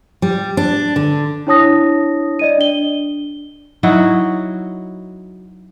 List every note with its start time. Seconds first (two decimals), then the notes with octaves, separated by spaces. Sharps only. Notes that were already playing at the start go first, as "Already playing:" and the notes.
0.22 G3
0.57 D4
0.96 D3
1.47 D4 E4 C#5 A5 D#6 A#6
2.39 D5 D#5 D#7
2.58 D4 G7
3.83 F#3 D#4 E4 F#4